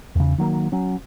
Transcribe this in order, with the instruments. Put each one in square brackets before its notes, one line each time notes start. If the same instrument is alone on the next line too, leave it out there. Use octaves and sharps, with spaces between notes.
[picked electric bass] E2 C#3
D#3 F#3 A#3
F#3 C#4